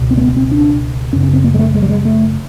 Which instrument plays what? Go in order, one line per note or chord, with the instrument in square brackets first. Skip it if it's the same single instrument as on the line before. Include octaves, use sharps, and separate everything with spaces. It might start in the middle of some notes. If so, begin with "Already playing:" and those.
Already playing: [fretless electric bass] C#2 B2
C4
A#3
B3
C4
D4
F#2 C#3 C#4
C#4
C4
A#3
G#3
A3
G#3
G3
G#3
A3